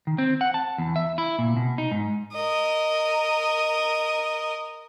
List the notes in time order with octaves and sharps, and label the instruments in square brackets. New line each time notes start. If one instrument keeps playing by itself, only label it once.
[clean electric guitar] D#3
C4
F#5
A5
E2
E5
E4
A#2
B2
D#4
G#2
[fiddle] A#4 D#5